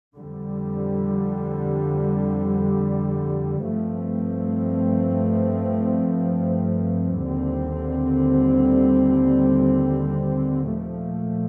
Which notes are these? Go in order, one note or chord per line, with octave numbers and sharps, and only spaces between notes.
F2 D3 G3
G2 F3 A3 C4
D#2 D3 G3 C4
A#2 F3 A3